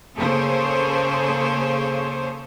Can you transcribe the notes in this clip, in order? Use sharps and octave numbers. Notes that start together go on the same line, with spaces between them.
C#3 A#3 G#4 A4 C5 C#5